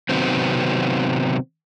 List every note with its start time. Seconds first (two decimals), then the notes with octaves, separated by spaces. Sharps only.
0.09 C3 D#3 F#3 B3 C4